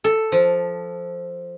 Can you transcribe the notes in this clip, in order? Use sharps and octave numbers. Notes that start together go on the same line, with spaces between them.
A4
F3